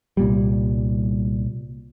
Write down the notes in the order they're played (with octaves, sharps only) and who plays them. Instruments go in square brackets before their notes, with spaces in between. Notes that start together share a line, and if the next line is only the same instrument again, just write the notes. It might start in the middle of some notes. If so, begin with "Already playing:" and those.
[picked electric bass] C2 A#2 G3